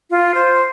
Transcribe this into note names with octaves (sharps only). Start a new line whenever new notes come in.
F4
C5